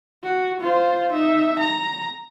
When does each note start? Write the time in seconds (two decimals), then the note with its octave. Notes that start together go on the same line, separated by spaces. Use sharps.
0.24 F#4
0.61 F4 C5
1.13 D#4 E5
1.59 A#5